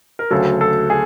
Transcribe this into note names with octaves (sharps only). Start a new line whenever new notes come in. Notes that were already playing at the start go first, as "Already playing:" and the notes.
A#4
D2 C#3 F#3 A4
A4
G#4